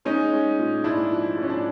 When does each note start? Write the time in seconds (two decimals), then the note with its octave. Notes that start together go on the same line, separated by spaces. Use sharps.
0.05 G#3 C#4 D#4
0.32 G#3
0.59 A#2
0.84 G#2 D4 E4
1.11 F3
1.37 G#2
1.42 C#4
1.50 D4